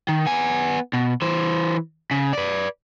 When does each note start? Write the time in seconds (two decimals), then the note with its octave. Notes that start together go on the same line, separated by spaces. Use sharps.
0.09 D#3
0.26 B3 G#5
0.93 B2
1.22 E3 C5
2.11 C#3
2.33 B4 D5